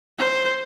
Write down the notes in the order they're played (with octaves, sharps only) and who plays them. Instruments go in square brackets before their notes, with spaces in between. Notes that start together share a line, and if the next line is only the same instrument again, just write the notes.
[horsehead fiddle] C5